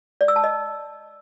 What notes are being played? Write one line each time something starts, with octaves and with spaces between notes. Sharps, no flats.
D5
E6
A5
D#5